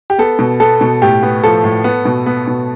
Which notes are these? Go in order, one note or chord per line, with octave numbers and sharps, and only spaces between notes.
G4
B3 A4
B2
B3 A4
B2
A2 G4
B3
F3 A4
A2
B3
B2
B3
B2